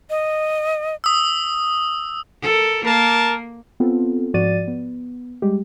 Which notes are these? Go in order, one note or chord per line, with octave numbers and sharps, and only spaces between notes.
D#5
D#6 E6
A4 A#4
A#3 A#4 A5
B3 C4 F4 A4
G#2 F3 F#4 D5 A6 D#7
B3
G3 G#3 G4